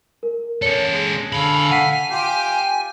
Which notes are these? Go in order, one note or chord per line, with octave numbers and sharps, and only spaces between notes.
A#4
C#4 A4 C#5 C#7
G#3
D3 A4 F5 B5
F#5 G#5 B6 C7
F4 G4 G5